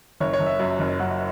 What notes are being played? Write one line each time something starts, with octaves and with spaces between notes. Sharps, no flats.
F#1 C#5
C#5
F#1
E5
F#2
F#1
F#2 F#5